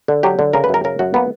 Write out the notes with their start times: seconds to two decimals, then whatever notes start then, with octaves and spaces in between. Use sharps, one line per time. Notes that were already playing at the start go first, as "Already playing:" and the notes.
0.08 D3
0.23 F#3 G4
0.39 D3
0.53 C#3 A#4
0.64 B4
0.69 F#2 A#4
0.84 C#3 A#4
0.99 F#2 F#4
1.14 A#3 B3